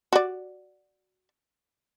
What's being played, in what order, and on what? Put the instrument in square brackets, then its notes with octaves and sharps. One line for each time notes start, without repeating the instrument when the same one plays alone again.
[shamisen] F#4 D5